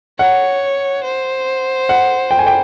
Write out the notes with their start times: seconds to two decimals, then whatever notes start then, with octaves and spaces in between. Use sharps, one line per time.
0.19 C#5 F#5
1.04 C5
1.89 F#5
2.31 G5
2.39 G#5
2.47 G5